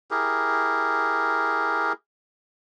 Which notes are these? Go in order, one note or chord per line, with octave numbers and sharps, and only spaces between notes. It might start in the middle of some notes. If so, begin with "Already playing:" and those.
E4 G4 G#4 A#4